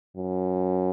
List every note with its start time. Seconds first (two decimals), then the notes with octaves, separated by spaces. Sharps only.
0.17 F#2